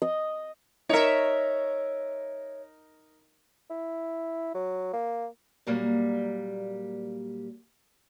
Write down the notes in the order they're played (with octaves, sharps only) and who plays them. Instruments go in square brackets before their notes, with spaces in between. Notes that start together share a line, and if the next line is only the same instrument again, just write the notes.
[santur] D#5
[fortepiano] D#4 A#4 [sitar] C#5 E5
[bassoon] E4
F#3
A#3
[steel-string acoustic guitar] A#2 F#3 G3 A#3